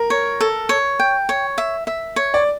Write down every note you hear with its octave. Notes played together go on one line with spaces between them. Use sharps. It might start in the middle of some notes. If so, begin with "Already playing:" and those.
Already playing: A#4
C#5
A4
C#5
G5
C#5
E5
E5
C#5
D5